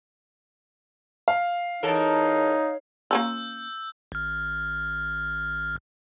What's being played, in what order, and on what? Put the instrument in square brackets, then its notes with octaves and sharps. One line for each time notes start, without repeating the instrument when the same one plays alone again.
[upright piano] F5
[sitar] E2 A4 A#4 [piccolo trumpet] D#4 [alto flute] C#5
[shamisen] A#3 C#4 F4 [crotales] E6 G6
[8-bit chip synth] G#1 F6